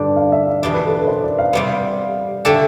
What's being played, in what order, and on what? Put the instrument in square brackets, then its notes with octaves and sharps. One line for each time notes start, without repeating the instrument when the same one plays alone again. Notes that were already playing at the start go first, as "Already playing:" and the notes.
Already playing: [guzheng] G2 D3 G3 D4
[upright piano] F5
E5
D5
[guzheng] E2 B2 G3 D4 [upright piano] D5
[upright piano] B4
A4
B4
C5
D5
F5
[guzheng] C3 G3 B3
[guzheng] D3 A3 D4 A4 [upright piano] G5